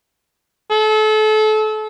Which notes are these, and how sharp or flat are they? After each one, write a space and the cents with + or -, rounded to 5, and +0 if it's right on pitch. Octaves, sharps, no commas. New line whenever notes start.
A4 -30